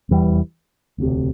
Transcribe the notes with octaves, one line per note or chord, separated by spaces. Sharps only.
F1 E2 E3 G3
E1 D2 C3